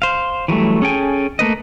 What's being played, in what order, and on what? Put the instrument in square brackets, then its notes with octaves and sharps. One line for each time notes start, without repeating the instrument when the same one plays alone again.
[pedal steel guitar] C5 F5
E3 F#3 G3 A3
C#4 G#4 A4 G5 G#5
A3 A#3 B4 D#5